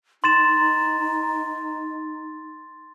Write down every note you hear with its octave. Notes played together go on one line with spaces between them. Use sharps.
D#4 C6 A6 E7